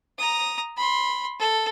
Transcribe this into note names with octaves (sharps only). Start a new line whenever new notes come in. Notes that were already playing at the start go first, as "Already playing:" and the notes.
A#5 D#6
B5 C6
A4